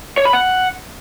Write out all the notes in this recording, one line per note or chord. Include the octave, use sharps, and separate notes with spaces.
C#5
B5
F#5